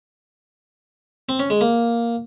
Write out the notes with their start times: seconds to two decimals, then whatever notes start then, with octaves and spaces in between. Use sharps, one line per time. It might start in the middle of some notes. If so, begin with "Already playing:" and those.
1.29 C4
1.40 C#4
1.50 G#3
1.61 A#3